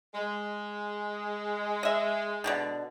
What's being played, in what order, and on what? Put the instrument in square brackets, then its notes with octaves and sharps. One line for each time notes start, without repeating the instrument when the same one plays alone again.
[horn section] G#3
[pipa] D#5 E5
B2 D3 D#3